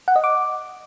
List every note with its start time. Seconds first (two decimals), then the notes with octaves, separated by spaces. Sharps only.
0.08 F#5
0.16 D#5
0.24 D6